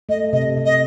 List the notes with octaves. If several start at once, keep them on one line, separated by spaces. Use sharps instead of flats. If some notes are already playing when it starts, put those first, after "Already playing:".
A3 D#5
C3 D#5
C3
D#5